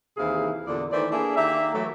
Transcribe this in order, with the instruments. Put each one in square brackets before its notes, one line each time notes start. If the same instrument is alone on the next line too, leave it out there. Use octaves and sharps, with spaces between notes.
[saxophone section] D#2 C3 E3 E4 G#4 F5
E2 A#2 D3 D5
D#3 E3 A3 C5 D5
A#3 D4 E4 G#4 A4 E5
D#3 A#3 G4 E5
E3 F#3 A3